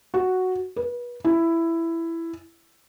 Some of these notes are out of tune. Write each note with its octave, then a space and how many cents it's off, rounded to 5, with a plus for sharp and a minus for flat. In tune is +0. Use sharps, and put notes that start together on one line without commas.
F#4 +0
B4 -30
E4 +10